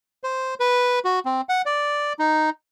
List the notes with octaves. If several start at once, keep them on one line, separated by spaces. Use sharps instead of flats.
C5
B4
F#4
C4
F#5
D5
D#4